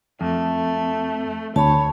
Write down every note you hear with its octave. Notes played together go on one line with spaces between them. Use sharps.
F2 A3
D2 C#5 A5 B5